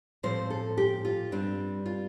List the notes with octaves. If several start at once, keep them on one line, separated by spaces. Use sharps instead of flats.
A2 F3 C4 C5
A4
G4
F4
G2 G3 C4 D4
F4